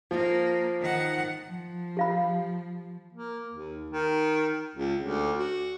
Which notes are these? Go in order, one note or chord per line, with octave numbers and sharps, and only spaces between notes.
F3 A#3
D#3 F#5
F3
G4 F5 B5
A#3
D#2
D#3
C#2
D2
F#4